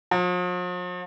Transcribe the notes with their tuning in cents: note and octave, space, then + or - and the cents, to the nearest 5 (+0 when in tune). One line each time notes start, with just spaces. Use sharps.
F3 +45